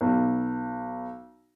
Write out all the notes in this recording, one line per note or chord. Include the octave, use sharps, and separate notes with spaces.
B1